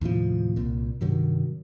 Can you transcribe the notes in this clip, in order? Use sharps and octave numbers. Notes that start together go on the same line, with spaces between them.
D#2 A2 C3 F3
C2 A#2
G2 C3 D#3 F#3